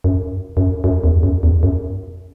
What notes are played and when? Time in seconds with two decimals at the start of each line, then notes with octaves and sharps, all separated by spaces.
0.04 F#2
0.57 F#2
0.84 F#2
1.04 E2
1.23 F#2
1.43 E2
1.63 F#2